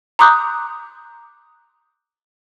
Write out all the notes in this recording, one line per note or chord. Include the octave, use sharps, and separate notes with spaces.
A#5 C6 D6 D#6 F#6 G6